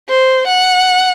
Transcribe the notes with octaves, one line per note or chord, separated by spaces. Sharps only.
C5
F#5